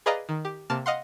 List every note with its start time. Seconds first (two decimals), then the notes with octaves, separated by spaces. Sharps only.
0.06 G#4 B4 D5 D#5 F5 A#5
0.29 D#3
0.45 G4
0.70 C3 A#3 A5 F6 A6
0.86 D#5 F5 F#5 C6